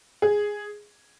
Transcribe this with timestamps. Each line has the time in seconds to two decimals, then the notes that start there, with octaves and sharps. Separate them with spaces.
0.22 G#4